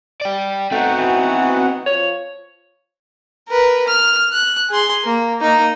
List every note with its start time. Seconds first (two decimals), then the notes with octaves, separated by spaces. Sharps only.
0.21 D5 G5
0.72 A3 B3 C4 D#4 F#4 F#5
0.98 E3
1.86 F3 C#5
3.48 A#4 B4
3.88 F6
4.33 F#6
4.70 G#4 C6
5.04 A#3
5.41 A#3 D#4